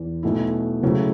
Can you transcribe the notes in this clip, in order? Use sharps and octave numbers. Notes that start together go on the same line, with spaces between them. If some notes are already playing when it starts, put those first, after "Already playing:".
Already playing: E2
B1 B2 A3 E4
C#2 C#3 F#3 A3 E4